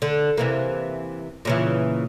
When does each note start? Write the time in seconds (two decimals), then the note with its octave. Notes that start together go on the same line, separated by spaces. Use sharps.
0.02 D3
0.37 C3 E3 A#3
1.45 A#2 C#3 E3